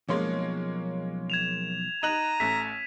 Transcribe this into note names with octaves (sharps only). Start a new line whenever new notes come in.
B1 F3 G#3 A#3 C#4 C6
G#6 E7 F7
D#4 A#5 F#6 D#7 F#7
A1 A3 B6